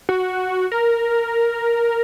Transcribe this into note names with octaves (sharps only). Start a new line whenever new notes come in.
F#4
A#4